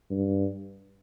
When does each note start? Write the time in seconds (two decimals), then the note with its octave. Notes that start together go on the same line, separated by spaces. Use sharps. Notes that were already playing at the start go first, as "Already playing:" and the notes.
0.11 G2